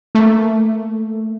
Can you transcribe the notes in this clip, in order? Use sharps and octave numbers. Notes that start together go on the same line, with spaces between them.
A3 A#3